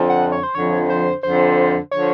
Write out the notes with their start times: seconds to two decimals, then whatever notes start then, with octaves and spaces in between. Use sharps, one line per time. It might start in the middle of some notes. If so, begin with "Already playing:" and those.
Already playing: F2 D3 F3
0.10 F#5
0.32 C#5
0.43 C5
0.55 F2 D3 F3 C#5
0.89 C5
1.23 F2 D3 F3 C5
1.91 D3 F3 C#5